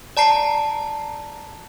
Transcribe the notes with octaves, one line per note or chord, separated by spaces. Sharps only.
D5 A5 A#5 C7